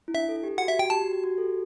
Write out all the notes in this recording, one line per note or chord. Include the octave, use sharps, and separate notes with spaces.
E4
D4 E5
A4
G4
F#4 F#5
G4 E5
F#4 G5
G4 A5
F#4
G4
F#4
A4
G4